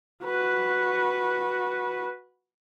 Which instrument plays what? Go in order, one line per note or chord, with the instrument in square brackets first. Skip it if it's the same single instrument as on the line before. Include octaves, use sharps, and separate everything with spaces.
[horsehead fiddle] F#4 B4